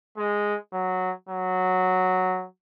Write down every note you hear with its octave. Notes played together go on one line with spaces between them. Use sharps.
G#3
F#3
F#3